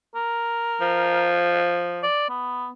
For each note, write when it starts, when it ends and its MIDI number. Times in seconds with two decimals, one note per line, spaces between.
0.15 1.30 70
0.81 2.03 53
2.03 2.28 74
2.29 2.70 59